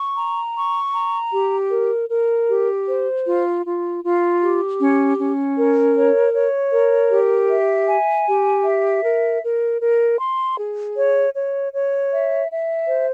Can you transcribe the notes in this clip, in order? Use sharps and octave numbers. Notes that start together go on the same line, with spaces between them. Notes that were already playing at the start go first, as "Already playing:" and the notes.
Already playing: C#6
A#5
C#6
A#5
G4
A#4
A#4
G4
C5
F4
F4
F4
G4
C#4
C#4
A#4
C#5
C#5
A#4
G4
E5
G#5
G4
E5
A#4
A#4
A#4
C6
G#4
C#5
C#5
C#5
E5
E5
C5